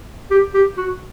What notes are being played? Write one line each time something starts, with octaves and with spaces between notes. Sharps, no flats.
G4
G4
F#4